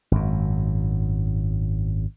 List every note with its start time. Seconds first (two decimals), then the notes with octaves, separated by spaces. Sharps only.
0.11 G#1 F#2